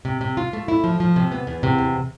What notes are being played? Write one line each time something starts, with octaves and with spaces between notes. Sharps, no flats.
C3
C3
F4
A3
E4
F3
F3
C3
B3
E2
C3
E2